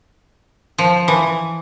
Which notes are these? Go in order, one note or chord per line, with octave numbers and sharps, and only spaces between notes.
F3
E3